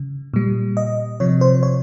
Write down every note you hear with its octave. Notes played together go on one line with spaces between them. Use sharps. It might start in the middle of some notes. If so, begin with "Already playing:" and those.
Already playing: C#3
A#2 G3
D#5
C3 F3 C#5
C5
C#5